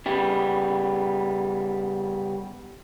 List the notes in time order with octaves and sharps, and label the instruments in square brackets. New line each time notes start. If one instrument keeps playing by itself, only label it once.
[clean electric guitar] C#3 G3 B3